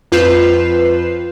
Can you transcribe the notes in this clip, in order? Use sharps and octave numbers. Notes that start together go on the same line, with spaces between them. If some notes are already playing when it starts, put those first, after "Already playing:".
F2 F4 B4 G6 C7 E7